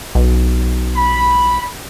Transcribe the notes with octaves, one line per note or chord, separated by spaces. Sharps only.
B1
B5